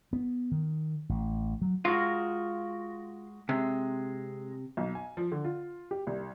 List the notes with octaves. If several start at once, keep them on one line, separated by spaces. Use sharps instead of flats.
B3
D#3
A1
F#3
G#3 F4 F#4 A#4
C3 G#3
B1
G#5
F3
D3
F4
G4
C2